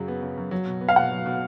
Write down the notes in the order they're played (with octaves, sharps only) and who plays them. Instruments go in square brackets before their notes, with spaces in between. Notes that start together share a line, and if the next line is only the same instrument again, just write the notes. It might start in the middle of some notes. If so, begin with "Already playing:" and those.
Already playing: [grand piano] F#2 C#3 F#3
B3
C#3
F#2
F#3
B2
B3
[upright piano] F5
[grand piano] B2 [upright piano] F#5
[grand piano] F#3
B2